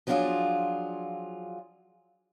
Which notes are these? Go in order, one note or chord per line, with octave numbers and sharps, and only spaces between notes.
F3 F#3 B3 D4 F4 G#4